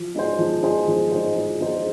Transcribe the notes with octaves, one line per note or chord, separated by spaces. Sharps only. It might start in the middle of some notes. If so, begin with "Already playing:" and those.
Already playing: F3
G#3 D#4 G#4 C5
F3
G#3 D#4 G#4 C5
F3
G#3 D#4 G#4 C5
F3
G#3 D#4 G#4 C5